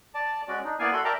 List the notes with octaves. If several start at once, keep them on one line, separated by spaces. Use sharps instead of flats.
D5 A5
G#3 C#4 F#4 D5
D4 D#4
A#3 B3 E4 D5 F5 G#5
F#4 A4 E5 B5 C6
A#4 D5 E5 G5 A5 A#5